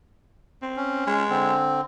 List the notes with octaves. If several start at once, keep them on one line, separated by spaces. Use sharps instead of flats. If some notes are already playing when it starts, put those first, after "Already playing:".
C4
C#4
G#3
D3 C4